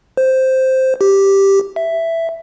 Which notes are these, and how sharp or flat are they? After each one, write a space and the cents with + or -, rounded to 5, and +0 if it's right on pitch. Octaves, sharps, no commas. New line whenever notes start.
C5 +0
G4 +0
E5 +5